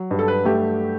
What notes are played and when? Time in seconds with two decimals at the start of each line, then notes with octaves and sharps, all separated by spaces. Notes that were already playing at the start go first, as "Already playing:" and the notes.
Already playing: F#3
0.11 G2
0.19 A4
0.28 B4
0.45 A3 G4